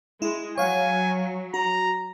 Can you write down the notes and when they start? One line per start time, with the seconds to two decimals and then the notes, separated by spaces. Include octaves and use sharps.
0.22 G#3 E4
0.58 F#3 C#5 F5 F#5 G#5
1.54 F#4 A#5